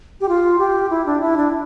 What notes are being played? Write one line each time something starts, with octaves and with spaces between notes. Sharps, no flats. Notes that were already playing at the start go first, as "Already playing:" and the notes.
G4
F4
G4
E4
D4
E4
D4